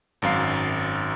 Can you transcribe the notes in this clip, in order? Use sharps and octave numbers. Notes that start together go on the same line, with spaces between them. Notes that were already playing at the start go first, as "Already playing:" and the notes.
G#1 F#2 F5 C7